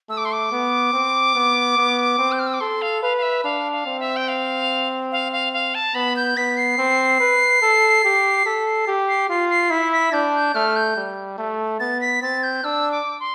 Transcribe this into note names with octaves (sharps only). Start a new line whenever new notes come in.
A3 E6
D6
C6
D6
B3
C4
B3
B3
C4
G6
F6
E6
D6
A4 C6
F5
B4 F5
F5
E5
D4 F5
F5
C4
E5
G5
F5
F5
F5
F5
A5
B3 B5
G6
B3 B6
C7
C4
B4
A4
G4
A4 B6
C7
G4
C7
F4 C7
C7
E4 B6
B6
D4 G6
G6
A3 F6
G6
G3
A3
B3 A6
B6
C4 A6
G6
D4 E6
D6
C6